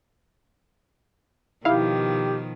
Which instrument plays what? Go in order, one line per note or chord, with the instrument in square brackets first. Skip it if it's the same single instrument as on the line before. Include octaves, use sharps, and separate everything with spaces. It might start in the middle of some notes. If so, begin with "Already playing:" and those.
[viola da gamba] B2 D#3 F3 [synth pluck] E4 F5 [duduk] G4